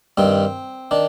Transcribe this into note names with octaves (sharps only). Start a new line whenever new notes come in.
G2 D#3 C4
D#3 D4